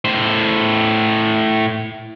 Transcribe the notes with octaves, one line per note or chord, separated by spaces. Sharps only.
A2 C5